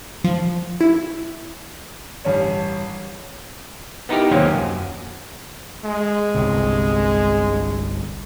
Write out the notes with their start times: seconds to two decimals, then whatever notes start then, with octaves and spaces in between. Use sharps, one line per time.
0.24 F3
0.81 E4
2.25 A1 G2 C#4 C#5
4.09 B3 D#4 E4 G4 A#4
4.31 D#2 C3 F3 F#3 A#3 C#4
4.46 F#2
5.85 G#3
6.35 G1 C2 C3